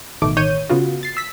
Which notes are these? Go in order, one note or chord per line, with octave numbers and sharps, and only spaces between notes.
A1 B2 D#3 A3 D6
A1 D#3 C#5 G6 D#7
C#3 B3 F4 F#4
A6 C7
E6 B6